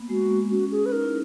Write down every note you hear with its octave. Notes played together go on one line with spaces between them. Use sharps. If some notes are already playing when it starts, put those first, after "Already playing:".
Already playing: A#3 B3
G#3 F#4
A#3
C#4 F#4
G#4
B4
D#4 A#4
E4